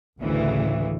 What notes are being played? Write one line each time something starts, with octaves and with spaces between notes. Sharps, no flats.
A1 D2 C#3 E3